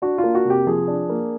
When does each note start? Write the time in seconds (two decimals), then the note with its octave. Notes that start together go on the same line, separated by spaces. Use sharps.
0.02 D4 F#4
0.18 F4
0.23 A#3
0.35 F#4
0.45 C3 G4
0.67 F3 G#4
0.88 D4
1.09 A#3